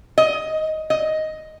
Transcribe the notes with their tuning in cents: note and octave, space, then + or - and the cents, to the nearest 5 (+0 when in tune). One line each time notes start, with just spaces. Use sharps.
D#5 +10
D#5 +5